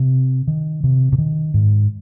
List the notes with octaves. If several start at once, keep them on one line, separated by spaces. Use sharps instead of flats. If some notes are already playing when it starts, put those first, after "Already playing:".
Already playing: C3
D#3
C3
C3
D#3
G#2